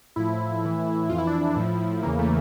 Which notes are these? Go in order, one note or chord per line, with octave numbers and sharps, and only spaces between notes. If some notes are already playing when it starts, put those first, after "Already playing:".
A2 F3 E4
A2 E3
F2 E3 F4
E4
D4
E4
A2 F3
E2 C#3 E3 A#3
A3